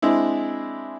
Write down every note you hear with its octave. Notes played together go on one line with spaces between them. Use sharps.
G#3 C4 D4 E4